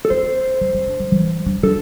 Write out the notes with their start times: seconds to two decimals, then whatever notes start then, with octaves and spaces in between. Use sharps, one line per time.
0.05 A4
0.10 C4 C5
0.61 A3
0.74 C4
0.87 D4
1.00 D3
1.12 E3
1.46 D4
1.63 D4 A4